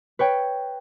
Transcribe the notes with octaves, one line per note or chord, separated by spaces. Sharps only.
B4 C#5 G5